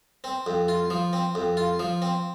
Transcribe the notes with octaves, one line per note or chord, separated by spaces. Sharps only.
C4
F2
F4
F3
C4
F2
F4
F3
C4